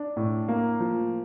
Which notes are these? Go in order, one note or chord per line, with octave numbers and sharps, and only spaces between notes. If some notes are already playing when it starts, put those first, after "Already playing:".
Already playing: D4
A2
A#3
F3